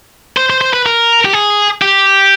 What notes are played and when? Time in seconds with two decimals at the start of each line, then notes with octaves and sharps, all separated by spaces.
0.37 C5
0.50 C5
0.61 C5
0.73 B4
0.86 A#4
1.25 G4
1.33 G#4
1.82 G4